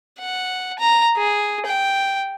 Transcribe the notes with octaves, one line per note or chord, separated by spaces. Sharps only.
F#5
A#5
G#4
G5